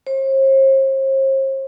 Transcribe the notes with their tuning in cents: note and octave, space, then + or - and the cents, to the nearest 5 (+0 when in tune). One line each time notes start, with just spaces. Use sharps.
C5 +45